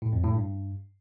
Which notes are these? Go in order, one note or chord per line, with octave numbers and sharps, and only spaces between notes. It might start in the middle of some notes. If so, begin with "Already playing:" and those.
A2
F2
A2
G2